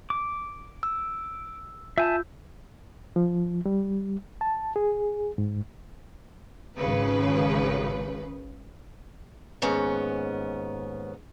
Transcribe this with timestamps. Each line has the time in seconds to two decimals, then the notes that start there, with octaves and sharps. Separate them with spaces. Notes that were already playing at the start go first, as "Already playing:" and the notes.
0.10 D6
0.83 E6
1.98 F4 E5 G#5 A5 E6 G6
3.16 F3
3.66 G3
4.41 A5
4.76 G#4
5.38 G#2
6.76 G#1 C#2 C#3 B4
9.62 D#2 G#2 B3 C#4